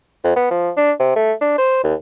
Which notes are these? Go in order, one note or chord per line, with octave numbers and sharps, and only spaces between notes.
F2
B3
F3
D4
C3
A3
D4
C5
D#2